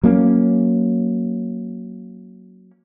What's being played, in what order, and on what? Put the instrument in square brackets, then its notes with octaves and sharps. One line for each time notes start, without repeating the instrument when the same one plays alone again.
[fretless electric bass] F#3 A#3 C#4